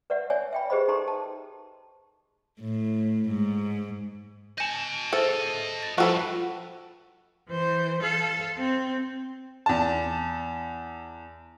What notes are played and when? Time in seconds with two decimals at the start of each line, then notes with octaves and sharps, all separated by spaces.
0.10 B4 D5 E5 F#5
0.30 C#5 D5 E5 G#5
0.53 E5 G5 B5
0.70 G4 G#4 B4 C5 D#5 B5
0.88 D#4 A4 A#5 C6 C#6
1.08 A5
2.60 A2
3.28 G#2
4.58 D#5 G#5 A5 G6
5.13 G#4 A4 C5 E5
5.83 A6
5.98 G2 F3 F#4 A4 B4 C5 G5
7.49 E3 C5
8.02 A4 F5
8.58 C4
9.66 E2 A5